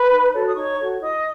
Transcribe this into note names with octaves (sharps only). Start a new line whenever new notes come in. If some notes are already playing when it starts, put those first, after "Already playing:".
Already playing: B4 B5
D#4
F#4 A4 C#5
D#6
D#4 C#5 C#6
F#4 A4 C#5
E4 D#5 D#6